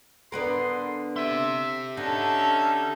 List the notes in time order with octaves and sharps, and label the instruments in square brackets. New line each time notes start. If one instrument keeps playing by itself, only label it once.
[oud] D3 B3 A#4 [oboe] C6
[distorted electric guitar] G4 C6 [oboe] E5
[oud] D3 [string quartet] C#4 A4 E5 [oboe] D#4